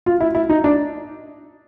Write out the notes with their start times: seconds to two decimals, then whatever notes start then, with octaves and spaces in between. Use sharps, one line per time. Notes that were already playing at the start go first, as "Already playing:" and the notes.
0.06 F4
0.21 E4
0.35 E4
0.50 D#4
0.64 D4